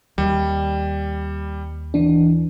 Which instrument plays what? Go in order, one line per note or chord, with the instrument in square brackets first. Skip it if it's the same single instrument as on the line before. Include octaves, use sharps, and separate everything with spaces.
[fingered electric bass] D#2 [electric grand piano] G3
[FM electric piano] E3 D4